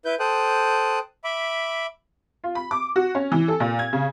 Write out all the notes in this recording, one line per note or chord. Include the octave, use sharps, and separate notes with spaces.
E4 B4 G6
A4 C5 G5 D#6 F#6
E5 B5 D6
F4
B5
D6
F#4
C#4
E3
A4
A#2
G#6
C#3